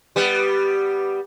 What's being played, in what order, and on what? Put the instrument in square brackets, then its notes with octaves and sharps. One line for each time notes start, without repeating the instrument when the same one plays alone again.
[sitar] G3 B3